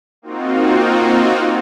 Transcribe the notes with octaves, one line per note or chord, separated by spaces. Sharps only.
A#3 C4 D#4 F4 F#4